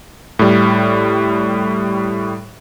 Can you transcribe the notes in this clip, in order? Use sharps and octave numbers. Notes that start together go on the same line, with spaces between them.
A2 G3